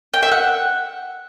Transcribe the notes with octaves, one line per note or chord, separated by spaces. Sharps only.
G5
E5
F#5